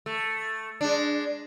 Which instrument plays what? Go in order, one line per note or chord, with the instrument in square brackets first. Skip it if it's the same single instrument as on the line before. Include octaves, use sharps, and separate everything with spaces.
[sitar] A3
G#3 D4